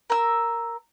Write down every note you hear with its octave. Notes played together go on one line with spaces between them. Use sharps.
A#4 E6